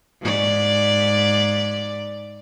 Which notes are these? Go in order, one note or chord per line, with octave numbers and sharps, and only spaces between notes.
G#2 D5